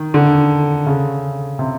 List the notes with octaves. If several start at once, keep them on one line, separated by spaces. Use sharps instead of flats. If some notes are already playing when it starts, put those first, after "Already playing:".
Already playing: D#3
D3
C#3
C3